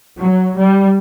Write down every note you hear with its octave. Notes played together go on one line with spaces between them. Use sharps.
F#3
G3